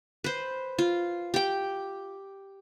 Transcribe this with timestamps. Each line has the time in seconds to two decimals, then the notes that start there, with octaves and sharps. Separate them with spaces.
0.24 B4 C5
0.79 F4
1.34 G4 G5